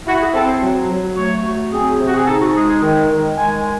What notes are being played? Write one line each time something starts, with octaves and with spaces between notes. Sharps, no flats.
E4 F#4
G#4
C4 A4
C5
F#3
F#3
A3 C#5
F#3
C4 G#4
C3
F#4
G#4
D#4 A4
F#4
G#3 G#4
G#4
D#3
D#3
G#3 G#5